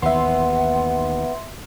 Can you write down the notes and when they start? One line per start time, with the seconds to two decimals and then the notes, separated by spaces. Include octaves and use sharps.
0.02 D#2 E3 B3 E5 F#5 C6